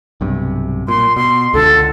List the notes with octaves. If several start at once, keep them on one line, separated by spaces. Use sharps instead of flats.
B1 G2 C3
A#2 C6
B2 C6
C#2 D3 A4